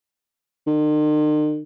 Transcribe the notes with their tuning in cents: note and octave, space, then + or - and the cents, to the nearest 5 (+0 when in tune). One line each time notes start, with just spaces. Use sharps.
D#3 -45